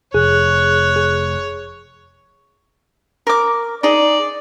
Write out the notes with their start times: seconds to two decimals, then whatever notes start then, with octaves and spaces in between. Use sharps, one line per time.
0.14 F1 G#4 C#5 F#6
0.96 G#4
3.27 A#4 D6
3.83 D#4 G#4 D5